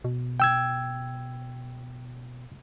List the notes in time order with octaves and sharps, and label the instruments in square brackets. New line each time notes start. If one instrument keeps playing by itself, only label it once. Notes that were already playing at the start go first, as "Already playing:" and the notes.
[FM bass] B2
[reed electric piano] G5 E6 G#6